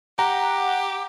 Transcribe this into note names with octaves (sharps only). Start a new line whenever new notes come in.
G4 F#5 A#5